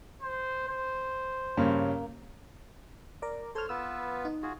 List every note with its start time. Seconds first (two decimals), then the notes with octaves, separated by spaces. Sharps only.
0.22 C5
0.68 C5
1.57 G2 C#3 A#3 C#4
3.22 A#4 D5
3.55 A4 C5 C#5 C6 F6
3.69 B3 F4 B4 E6
4.25 D#4
4.43 F4 F#4 G#4